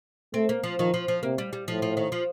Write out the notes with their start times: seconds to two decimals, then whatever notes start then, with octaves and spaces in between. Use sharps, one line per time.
0.34 A3 C4
0.49 A#3
0.64 F3
0.78 D#3 F3
0.94 F3
1.08 F3
1.23 C3 A#3
1.38 G3
1.53 G3
1.68 A2 F3
1.82 F3
1.97 D#3
2.12 F3